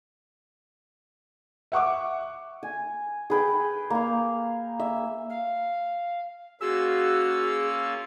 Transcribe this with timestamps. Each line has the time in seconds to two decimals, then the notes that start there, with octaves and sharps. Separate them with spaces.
1.72 E5 F#5 C#6 D6
2.63 G#5
3.30 G#4 B4 G5
3.90 A#3 F5
4.80 E5
5.30 F5
6.61 A#3 C#4 F4 F#4 G#4 E6